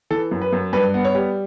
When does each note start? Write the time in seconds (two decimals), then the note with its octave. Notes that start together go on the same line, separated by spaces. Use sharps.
0.10 E3 A4
0.31 F#2
0.41 B4
0.53 F#2
0.73 G2 B4
0.94 B3
1.05 C#5
1.15 G3